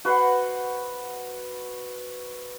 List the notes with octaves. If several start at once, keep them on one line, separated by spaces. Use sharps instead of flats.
F#4 B4 C5 F#5